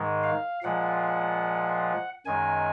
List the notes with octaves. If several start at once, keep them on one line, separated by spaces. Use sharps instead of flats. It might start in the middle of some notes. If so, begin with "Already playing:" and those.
Already playing: G#2 D#3 G#3
F5
A#2 F3 G#3 F#5
F#2 D#3 G#3 G#5